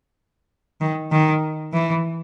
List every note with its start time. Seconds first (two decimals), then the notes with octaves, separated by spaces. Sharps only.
0.81 D#3
1.12 D#3
1.73 E3